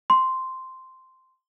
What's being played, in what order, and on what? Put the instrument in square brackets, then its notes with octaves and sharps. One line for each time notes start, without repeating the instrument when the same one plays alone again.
[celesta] C6